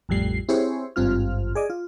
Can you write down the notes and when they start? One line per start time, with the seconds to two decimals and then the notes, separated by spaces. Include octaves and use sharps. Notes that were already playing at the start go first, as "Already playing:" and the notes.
0.09 A1 F2 A2 G3 C7
0.49 C4 E4 G4 G#4 C5 C#5
0.96 G#1 G2 C4 F4 F6
1.55 G#4 D5 D#5
1.70 F4